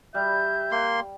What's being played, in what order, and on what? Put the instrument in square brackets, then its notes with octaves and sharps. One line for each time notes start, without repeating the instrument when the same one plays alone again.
[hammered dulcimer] G3 [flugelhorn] E5 [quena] G6
[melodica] A#3 C6